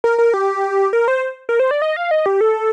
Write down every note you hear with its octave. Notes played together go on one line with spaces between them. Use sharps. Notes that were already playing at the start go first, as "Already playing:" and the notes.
A#4
A#4
G4
A#4
C5
A#4
C5
D5
D#5
F5
D#5
G4
A4